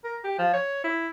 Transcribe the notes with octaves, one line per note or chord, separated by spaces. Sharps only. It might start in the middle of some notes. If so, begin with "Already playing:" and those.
A#4
G4
F3
C#5
E4